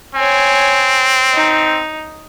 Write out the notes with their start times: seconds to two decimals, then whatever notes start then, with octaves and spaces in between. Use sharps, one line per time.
0.15 C4 C#5 G#5
1.34 D#4